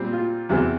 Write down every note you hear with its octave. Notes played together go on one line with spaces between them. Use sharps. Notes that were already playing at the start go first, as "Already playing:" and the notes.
Already playing: A#2 G3 C4
F4
E2 C3 E3